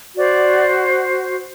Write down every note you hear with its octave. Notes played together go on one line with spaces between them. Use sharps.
F#4 C5 D5